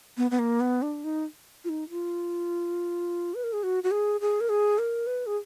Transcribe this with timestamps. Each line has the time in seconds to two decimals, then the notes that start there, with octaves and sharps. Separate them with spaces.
0.17 B3
0.31 B3
0.39 A#3
0.60 B3
0.82 D4
1.04 D#4
1.64 F4
1.69 D#4
1.90 F4
3.35 B4
3.44 A#4
3.53 G#4
3.63 F#4
3.84 F#4
3.91 G#4
4.21 G#4
4.41 A#4
4.49 G#4
4.78 A#4
5.07 B4
5.26 G#4